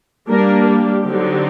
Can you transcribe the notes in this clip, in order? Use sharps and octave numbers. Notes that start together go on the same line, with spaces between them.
G3 A#3 D4 A#4
G4
D3 F#3 C4 D#4